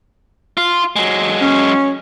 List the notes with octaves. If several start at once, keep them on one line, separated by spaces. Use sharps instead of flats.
F4
F#3 G#3
C#4